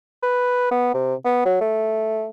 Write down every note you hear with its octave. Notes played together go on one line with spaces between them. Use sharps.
B4
B3
C3
B3
F#3
A3